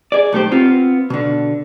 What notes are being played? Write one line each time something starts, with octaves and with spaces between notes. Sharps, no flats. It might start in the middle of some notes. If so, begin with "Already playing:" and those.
G#4 D5
B1 A3 G4 C5
B3 C4 F4
B2 D3